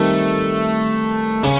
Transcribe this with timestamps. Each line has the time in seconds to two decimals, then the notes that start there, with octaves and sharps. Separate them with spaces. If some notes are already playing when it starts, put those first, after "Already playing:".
Already playing: D#3 G3 A3 C4 D#4
1.43 C#3 C#4